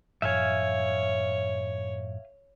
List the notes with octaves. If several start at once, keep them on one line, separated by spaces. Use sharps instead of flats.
F#2 A2 F3 C#5 E5 F5 G#5